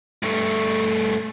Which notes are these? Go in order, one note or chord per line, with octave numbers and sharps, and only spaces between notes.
G2 A3